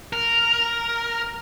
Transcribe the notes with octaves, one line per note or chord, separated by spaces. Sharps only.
A#4